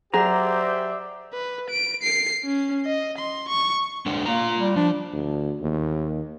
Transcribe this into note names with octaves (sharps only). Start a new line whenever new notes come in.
F#3 G4 G#4 C5 D5 E5 A#5
B4
D7
C7
C#4
D#5
C6
C#6
G#3 D4 A4
A#3 F4 A#5
G3
F3 D4
D2
D#2